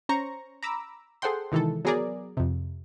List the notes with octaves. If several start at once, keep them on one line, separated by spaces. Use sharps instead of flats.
C#4 C5 A#5 C#6
A#5 B5 D6 E6
G#4 A4 C5 F#5 G5 C6
C3 D#3 E3 G#3 A4
F#3 B3 G#4 A#4 D5
F2 C3